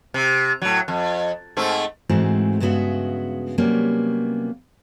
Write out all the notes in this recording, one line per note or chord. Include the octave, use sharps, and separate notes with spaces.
C3
A2 F#3
F2
G#2 A3 C4
G#2 E3 G#3 A3 C4 F#4
G2 C#3 G#3 B3 F#4 E5
C3 F#3 G3 A#3 B3 C#4